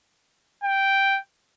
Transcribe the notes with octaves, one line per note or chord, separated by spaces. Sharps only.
G5